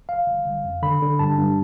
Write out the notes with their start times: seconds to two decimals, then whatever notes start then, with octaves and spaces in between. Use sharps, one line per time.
0.09 G1 F5
0.27 G1
0.46 G1
0.64 F2
0.82 D3 B5
1.02 D3
1.19 G2 A5
1.38 G2